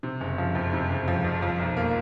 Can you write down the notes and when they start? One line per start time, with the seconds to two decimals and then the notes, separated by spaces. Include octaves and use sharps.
0.03 C3
0.21 F#1
0.38 F3
0.55 F2
0.73 C3
0.90 F#1
1.08 F3
1.24 F2
1.42 F3
1.59 B1
1.77 A#3